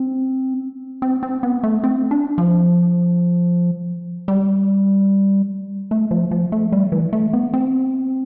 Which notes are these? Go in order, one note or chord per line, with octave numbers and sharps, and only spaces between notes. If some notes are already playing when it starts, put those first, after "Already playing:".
Already playing: C4
C4
C4
B3
A3
C4
D4
F3
G3
A3
F3
F3
A3
G3
E3
A3
B3
C4